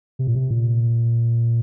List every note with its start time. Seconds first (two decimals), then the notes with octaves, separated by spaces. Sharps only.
0.19 C3
0.27 A#2
0.35 C3
0.51 A#2